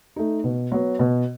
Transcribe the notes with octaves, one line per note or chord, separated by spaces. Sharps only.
A3 D#4
B2
F#3 B3
B2